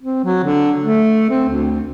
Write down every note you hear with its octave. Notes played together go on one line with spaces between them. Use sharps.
C4
F#3
D3
A3
C4
D2